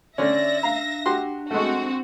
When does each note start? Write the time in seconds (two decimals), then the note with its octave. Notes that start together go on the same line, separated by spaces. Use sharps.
0.18 D3 C#4 D5 E5 A#6
0.63 D4 F5 A#5
1.06 F#4 G4 C6
1.51 G#3 A3 C4 F#4